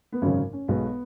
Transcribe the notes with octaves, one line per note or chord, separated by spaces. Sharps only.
B3
G#1 F#2 C#3 F#3 C#4
C#4
B1 B2 G#3 B3